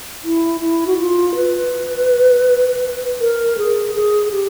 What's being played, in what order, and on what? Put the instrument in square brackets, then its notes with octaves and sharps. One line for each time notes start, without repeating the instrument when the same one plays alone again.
[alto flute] E4
E4
F#4
F4
B4
A#4
G#4
G#4
G4